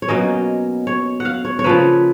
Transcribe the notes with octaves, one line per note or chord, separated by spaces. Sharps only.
C#5
B2 F#3 A#3 C#4 D#5
C#5
F#5
F5
C#5
C#5
C#3 F3 A#3 B4